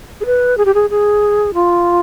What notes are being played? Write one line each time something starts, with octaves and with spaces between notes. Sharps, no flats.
G#4
B4
G#4
G4
G#4
G#4
F4